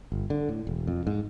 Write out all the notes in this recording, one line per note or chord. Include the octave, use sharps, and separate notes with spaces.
G1
D3
A2
E1
F2
G#2